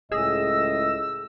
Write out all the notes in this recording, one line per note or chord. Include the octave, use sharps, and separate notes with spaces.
C#2 A2 G#4 D#5 E6